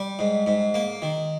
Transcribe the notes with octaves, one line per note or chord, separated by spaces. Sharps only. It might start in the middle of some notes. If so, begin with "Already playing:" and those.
Already playing: G3
G#2
G#2
A#3
D#3